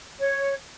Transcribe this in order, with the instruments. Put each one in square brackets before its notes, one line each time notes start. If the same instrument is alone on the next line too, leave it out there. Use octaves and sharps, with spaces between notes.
[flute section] C#5